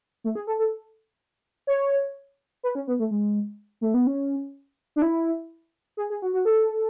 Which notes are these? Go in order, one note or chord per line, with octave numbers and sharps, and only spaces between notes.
A3
G#4
A4
A4
C#5
B4
C#4
B3
A3
G#3
A3
B3
C#4
D4
E4
G#4
G#4
F#4
F#4
A4